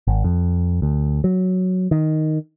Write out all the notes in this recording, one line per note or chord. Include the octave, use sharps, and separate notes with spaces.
G#1
F2
D2
F#3
D#3